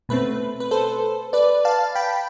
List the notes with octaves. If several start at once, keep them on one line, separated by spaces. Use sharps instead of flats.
B2 A3 C4 B4
B4
A4 C5
B4 D5
F5 A5
G5 B5